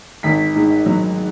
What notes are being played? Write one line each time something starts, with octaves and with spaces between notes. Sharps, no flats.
G#1 B6
G#2
F#3